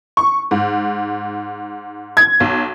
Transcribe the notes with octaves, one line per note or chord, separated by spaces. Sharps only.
C#6
G#2
G#6
B1